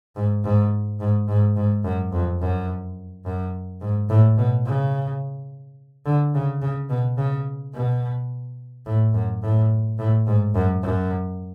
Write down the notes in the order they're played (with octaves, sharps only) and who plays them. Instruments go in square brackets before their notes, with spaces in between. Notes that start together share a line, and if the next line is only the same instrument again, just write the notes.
[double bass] G#2
G#2
G#2
G#2
G#2
F#2
F2
F#2
F#2
G#2
A2
B2
C#3
D3
C#3
C#3
B2
C#3
B2
A2
F#2
A2
A2
G#2
F#2
F#2